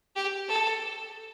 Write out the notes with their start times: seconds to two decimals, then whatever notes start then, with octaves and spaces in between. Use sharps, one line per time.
0.16 G4
0.49 A4